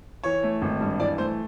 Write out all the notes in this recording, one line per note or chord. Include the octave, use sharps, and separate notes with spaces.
E3 C#5
A3
G#1
G2
E3 D5
A3 C5